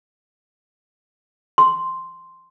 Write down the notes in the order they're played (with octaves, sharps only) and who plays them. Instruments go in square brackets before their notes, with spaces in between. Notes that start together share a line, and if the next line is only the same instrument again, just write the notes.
[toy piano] C6